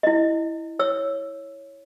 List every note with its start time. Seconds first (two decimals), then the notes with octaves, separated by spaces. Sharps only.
0.03 E4 D#5
0.79 C#5 E6